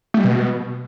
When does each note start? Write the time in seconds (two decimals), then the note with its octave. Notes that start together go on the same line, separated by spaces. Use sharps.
0.14 A3
0.19 G3
0.25 B2